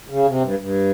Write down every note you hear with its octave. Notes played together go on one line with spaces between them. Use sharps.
C#3
C3
G2
G2